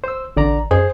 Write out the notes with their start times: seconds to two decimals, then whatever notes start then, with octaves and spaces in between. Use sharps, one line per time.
0.04 C5 E6
0.37 A1 D3 D5 A#5
0.71 F#2 G#4 C5